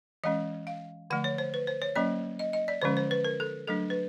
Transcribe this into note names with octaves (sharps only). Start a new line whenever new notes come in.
E3 G#3 C#4 D#5
F5
D3 F3 A3 F#5
C#5
C5
B4
C5
C#5
F#3 A#3 C#4 D5
D#5
D#5
D5
D3 F3 G#3 C#4 C5
C5
B4
A#4
A4
F#3 A3 D4 A4
B4